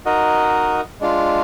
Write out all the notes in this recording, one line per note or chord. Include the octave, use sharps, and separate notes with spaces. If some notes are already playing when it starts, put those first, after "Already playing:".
D#4 F#4 A#4 D#5
G#3 D4 F4